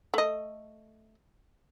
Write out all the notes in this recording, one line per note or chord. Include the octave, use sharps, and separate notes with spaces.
A3 D#5